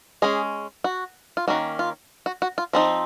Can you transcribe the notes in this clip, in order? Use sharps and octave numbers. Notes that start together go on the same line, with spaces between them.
G#3 C#4 G#4
F#4
F4
D#3 A#3 C#4 F#4
F4
F#4
F#4
F4
F3 C4 D#4